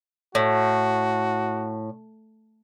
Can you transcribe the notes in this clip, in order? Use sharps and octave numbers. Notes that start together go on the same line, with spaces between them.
A2 F#4